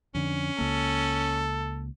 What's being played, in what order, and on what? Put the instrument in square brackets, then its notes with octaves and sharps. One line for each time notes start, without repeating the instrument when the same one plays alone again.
[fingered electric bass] F2 D3 [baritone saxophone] C#4
[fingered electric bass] C#2 A#3 [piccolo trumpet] A4